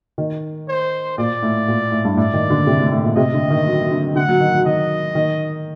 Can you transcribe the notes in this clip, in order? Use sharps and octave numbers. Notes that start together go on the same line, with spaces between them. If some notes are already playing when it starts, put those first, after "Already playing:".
D#3
C5
A#2 D5
A2
A#2
A2
G2
A2 D5
D#3
D3
C3
A2
A2
A#2
C3 D#5
D3
D#3
F#3
F#3
D3
D3 F#5
F#3
D#3
F#3
D#3 D#5
D#3